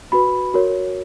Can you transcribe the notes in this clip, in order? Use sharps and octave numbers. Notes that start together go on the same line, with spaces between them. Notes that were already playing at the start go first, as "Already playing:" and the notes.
F#4 B4 B5
F#4 A#4 C#5